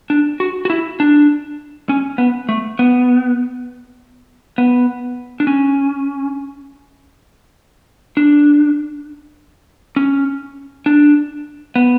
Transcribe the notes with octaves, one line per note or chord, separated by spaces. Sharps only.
D4
F#4
F#4
E4
D4
C#4
B3
A3
B3
B3
D4
C#4
D4
C#4
D4
B3